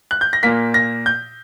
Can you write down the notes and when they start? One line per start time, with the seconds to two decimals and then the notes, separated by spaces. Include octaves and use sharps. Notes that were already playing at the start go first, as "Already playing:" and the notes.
0.11 F#6
0.21 G6
0.33 A#6
0.43 A#2 A#3 B6
0.74 A#6
1.06 G6